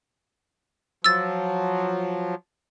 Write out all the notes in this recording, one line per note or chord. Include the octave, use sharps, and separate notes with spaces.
F3 F#3 E6 A6